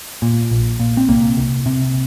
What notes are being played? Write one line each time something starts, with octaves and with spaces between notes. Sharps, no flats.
A#2
A#1
A#2
C4
C2 A#3
C2
C3